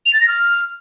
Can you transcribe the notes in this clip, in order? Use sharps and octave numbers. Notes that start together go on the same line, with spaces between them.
F7
A6
A#6
F6